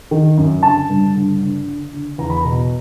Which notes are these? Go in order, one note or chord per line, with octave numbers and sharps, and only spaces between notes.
D#3
F#2
D3 A5
G2
D3
D3
D3
D3
E2 A#5
B5
B2 A#5